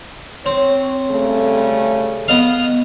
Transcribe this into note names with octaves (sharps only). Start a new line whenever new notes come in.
C4 C#5
C#3 G3 A3
B3 D#5 F5